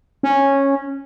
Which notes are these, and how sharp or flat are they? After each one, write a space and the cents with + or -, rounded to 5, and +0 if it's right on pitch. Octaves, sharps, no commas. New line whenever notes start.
C#4 -10